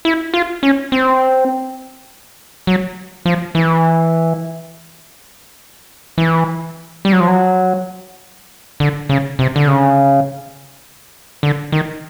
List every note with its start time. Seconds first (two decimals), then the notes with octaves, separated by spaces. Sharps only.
0.05 E4
0.34 F4
0.63 C#4
0.92 C4
2.67 F#3
3.26 F3
3.55 E3
6.18 E3
7.05 G3
7.13 F#3
7.20 F3
7.28 F#3
8.80 D3
9.09 C#3
9.39 C3
9.56 D3
9.68 C#3
11.43 D3
11.72 D#3